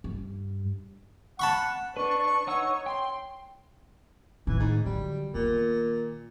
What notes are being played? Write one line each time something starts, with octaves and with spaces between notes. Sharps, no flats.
G2
F#5 A5 B5 C#6
D4 B4 C#6
D#4 C#5 F#5 E6
G5 C6
A2 D#3 E3
G#2
D3 F#3 G3
A#2 D#3 B3